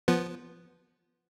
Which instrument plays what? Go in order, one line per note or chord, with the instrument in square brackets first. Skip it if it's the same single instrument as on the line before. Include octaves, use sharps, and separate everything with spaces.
[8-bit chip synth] F3 B3